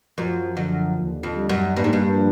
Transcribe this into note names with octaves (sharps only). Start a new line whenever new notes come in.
F#2 F3
F#2 D3
D#2
F2
G3
F#2
G2 A#3
G#2
G2
F3